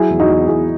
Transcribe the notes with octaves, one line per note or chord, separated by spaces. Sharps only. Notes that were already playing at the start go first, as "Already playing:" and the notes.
Already playing: F#3 E4 G#4
E2
D#4 F#4
E2
E2 E4 G#4